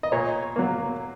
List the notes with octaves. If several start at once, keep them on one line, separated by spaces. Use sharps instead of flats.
D#5
A#2 C#5
F#3 A#3